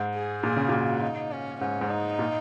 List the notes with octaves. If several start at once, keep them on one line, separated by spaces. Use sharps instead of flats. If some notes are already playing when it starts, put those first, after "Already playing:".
Already playing: G#2
G#4
A#2 G#4
C#3
A#2 F#4
D#4
C#4
G#2 C#4
G#2
D#4
A#2